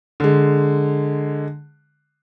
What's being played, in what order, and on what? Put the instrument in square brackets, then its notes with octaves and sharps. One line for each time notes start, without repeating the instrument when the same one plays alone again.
[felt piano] D3 G#3